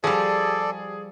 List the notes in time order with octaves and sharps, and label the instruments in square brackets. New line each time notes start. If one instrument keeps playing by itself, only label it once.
[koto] F3 G3 [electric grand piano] G#4 [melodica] A4 D5